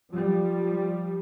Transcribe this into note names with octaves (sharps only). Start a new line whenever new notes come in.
F3 G3